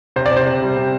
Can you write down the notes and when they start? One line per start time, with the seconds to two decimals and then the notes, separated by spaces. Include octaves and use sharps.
0.16 C3 C5
0.26 D5
0.32 C3 C5
0.46 C3
0.62 G3
0.77 C3